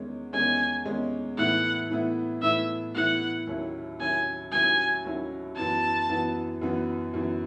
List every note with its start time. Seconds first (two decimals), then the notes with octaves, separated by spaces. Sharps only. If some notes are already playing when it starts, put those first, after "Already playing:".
Already playing: E2 D#3 G#3 C#4
0.33 E2 D#3 G#3 C#4 G#5
0.86 E2 D#3 G#3 C#4
1.38 A2 E3 B3 E4 F#5
1.90 A2 E3 B3 E4
2.43 A2 E3 B3 E4 E5
2.95 A2 E3 B3 E4 F#5
3.47 D#2 D#3 F#3 C#4 E4
4.00 D#2 D#3 F#3 C#4 E4 G#5
4.52 D#2 D#3 F#3 C#4 E4 G#5
5.05 D#2 D#3 F#3 C#4 E4
5.56 F#2 E3 B3 A5
6.09 F#2 E3 B3
6.62 F#2 E3 B3
7.14 F#2 E3 B3